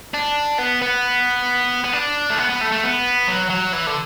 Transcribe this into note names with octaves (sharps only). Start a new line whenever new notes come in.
D4
B3
B3
B3
D4
A3
B3
B3
A3
A3
B3
F#3
F#3
E3
D3